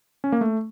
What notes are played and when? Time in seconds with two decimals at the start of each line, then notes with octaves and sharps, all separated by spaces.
0.24 C#4
0.32 A#3
0.41 A3